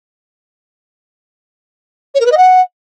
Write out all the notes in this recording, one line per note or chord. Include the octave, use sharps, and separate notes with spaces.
C#5
A#4
B4
D#5
F#5